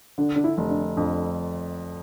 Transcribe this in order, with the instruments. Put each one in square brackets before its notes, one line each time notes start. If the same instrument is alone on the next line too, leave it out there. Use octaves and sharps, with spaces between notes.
[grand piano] D3 [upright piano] D4
[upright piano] D4
E4
[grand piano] F1
[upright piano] D4
[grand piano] F2 [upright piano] D4